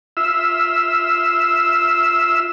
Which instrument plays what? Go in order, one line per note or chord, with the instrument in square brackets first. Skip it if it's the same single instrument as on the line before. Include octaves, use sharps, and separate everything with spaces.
[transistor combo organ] F4 E5 E6